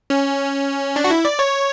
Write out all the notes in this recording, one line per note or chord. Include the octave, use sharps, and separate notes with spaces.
C#4
D4
F#4
E4
D5
C#5